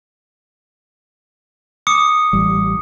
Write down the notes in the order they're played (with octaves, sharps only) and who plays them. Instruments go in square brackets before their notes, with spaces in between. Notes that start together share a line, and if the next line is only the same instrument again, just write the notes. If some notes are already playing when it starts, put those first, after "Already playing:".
[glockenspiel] D6 D#6 C#7
[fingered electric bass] A1 G3